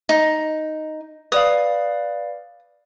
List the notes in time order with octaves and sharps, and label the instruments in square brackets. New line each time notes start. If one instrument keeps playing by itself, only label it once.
[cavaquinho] D#4
[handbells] B4 D5 F5 [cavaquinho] D#6